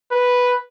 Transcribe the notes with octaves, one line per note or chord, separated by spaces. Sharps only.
B4